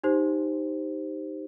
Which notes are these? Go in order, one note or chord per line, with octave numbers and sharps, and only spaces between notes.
D#4 G4 C5